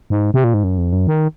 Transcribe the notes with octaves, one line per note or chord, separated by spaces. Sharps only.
G#2
C3
A#2
G#2
F#2
F2
F#2
D#3